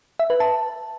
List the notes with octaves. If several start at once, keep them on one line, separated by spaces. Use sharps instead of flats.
E5
B4
A5